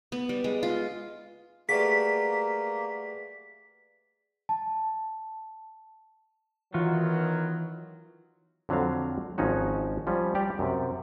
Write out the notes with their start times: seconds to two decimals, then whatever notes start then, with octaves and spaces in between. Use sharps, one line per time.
0.12 B3
0.29 G3
0.44 G#3
0.63 F4
1.69 F#3 G3 A3 A#3 G#4 B4 B6
4.49 A5
6.74 D#3 E3 F#3 B3 F4 F#4
8.69 F2 D3 F#3 C4 F5
9.38 G#1 F3 C#4 D#4 F#4
10.07 F3 G3 C#4
10.35 G3 G4 D5 G5
10.59 F#2 C3